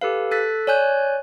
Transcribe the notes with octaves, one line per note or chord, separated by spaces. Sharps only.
G4 A4 B4 F5
A4 F#6 A6 B6
C#5 D5 G#5 F#6 G6